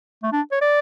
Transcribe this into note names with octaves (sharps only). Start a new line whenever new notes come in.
A3
D4
C#5
D5